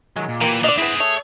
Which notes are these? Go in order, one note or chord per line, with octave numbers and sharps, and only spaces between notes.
D#3 F#3 G#3
A#2
E3 A#3 G4
D3 D5 D#5
B3 C4 E4 G#4 B4
A3 C#5